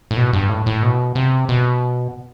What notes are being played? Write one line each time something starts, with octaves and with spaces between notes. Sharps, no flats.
A2
B2
G2
A2
A2
B2
C3
B2